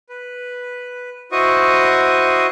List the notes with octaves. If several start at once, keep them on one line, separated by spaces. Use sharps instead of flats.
B4
E4 F#4 C5 D#5 C#6 D#6